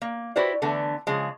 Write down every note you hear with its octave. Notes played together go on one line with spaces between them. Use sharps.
A#3
E4 F#4 G4 B4 C5 D5
D3 E3 A3 B3
C#3 F3 G#3